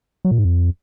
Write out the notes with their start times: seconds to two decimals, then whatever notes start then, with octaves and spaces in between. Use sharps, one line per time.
0.25 F#3
0.31 A#2
0.38 G#2
0.45 F2